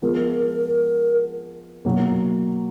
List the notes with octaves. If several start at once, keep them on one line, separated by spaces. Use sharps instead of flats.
F3 G#3 B3 A#4
B2 F#3 A#3 D#4